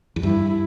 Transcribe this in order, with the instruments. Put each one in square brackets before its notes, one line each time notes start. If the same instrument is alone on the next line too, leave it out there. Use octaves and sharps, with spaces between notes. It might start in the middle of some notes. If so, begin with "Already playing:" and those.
[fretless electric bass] E2
[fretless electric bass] G2 [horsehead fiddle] E4